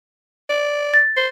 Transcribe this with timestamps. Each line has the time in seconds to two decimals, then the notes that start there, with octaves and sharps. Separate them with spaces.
0.50 D5
0.94 A6
1.17 C5